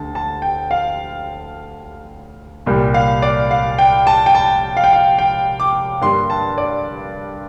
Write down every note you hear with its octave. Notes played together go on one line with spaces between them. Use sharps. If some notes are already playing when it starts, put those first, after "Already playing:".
Already playing: D2 D3 A3 A5
A5
G5
F5
C2 A#2 G3 A#3
F5
D5
F5
G5
A5
G5
A5
F5
G5
F5
G5
D6
G2 D3 G3 A#3 C6
A5
D5